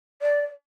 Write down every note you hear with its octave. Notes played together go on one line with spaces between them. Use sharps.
D5